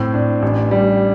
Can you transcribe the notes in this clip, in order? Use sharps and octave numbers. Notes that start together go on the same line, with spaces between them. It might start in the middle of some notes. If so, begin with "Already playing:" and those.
Already playing: A2 C4
D4
A1
G3